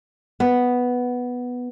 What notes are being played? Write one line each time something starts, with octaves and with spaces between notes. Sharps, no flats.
B3